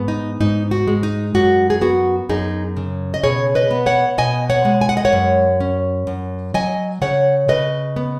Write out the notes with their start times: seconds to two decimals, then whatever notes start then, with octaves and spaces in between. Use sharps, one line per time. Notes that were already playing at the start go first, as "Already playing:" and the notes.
Already playing: G#2 B3
0.08 D#4
0.40 G#2 D#4
0.71 F#4
0.87 G#3
1.03 D#4
1.35 F#2 F#4
1.70 G#4
1.81 B3 F#4
2.29 F#2 D#4 G#4
2.77 C#3
3.14 D#5
3.23 B2 G#4 C#5
3.55 B4 D#5
3.71 B3
3.86 C#5 F#5
4.18 B2 D#5 G#5
4.50 C#5 F#5
4.65 G#3
4.81 G#5
4.89 F#5
4.97 D#5
5.05 C#5 F#5
5.13 F#2
5.60 C#4
6.07 F#2
6.54 F#3 D#5 G#5
7.01 C#3 C#5 F#5
7.48 C#3 B4 D#5
7.96 B3